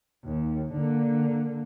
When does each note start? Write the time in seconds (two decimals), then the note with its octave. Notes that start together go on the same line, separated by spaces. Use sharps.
0.25 D#2
0.73 D3 A#3